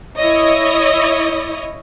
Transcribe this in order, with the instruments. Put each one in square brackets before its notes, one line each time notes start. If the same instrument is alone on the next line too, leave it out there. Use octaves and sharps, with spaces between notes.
[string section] E4 C#5 D#5